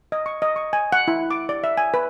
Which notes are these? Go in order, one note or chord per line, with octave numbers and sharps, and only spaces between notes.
D#5
C#6
D#5
C#6
G#5
F#5
E4
D6
D5
E5
G#5
B4